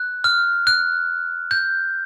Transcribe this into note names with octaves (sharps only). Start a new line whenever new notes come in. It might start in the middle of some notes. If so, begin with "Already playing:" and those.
Already playing: F#6
F6
F#6
G6